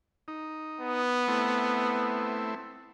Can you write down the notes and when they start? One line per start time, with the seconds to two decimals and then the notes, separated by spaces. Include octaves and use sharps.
0.28 D#4
0.81 B3
1.28 A3 C4 E4